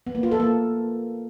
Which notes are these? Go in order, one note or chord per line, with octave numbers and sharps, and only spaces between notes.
B3
A#3
F4
A4
A#3